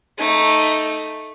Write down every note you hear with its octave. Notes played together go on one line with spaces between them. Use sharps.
A3 D#4